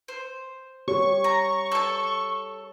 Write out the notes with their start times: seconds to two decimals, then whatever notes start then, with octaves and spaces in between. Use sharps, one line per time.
0.08 C5
0.88 G4 C#5 C#6
1.24 A#5
1.72 A4 A5